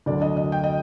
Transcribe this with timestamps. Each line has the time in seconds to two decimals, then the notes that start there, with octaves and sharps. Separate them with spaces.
0.06 D2 D3 F#3 D5
0.22 D#5
0.37 D#5
0.52 G5
0.64 D#5